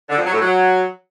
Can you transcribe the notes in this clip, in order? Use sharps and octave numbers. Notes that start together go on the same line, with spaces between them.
D3
F2
F#3
A2
F#3